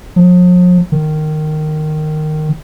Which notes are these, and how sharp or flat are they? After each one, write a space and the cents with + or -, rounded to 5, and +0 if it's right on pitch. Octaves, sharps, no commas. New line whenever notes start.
F3 +45
D#3 -15